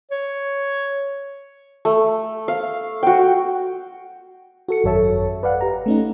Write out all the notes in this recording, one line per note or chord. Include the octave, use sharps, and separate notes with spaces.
C#5
A3
F5
F#4 G5
F#4 A4 C#7
G#1 F#2 A4 C#5 E5 A5
B4 D5 F5 F#5
G4 A#5
A3 C#4 D#4